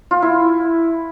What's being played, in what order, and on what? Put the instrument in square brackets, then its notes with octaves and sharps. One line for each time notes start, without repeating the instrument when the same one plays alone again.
[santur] F4
E4